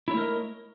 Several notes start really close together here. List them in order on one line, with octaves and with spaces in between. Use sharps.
E4 C#5 A3 A#4 D#5